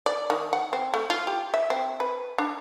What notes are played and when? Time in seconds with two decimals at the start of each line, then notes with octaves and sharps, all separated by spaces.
0.06 D5
0.30 D#3
0.53 F#5
0.73 C4
0.94 A3
1.10 F4
1.27 G4
1.54 E5
1.70 C4
2.00 B4
2.38 D4